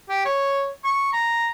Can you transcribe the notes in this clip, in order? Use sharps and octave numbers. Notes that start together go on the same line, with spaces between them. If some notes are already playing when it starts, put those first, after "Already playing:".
G4
C#5
C#6
A#5